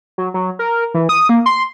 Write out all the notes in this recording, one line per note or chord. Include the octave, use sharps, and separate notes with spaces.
F#3
F#3
A#4
E3
D#6
A#3
C6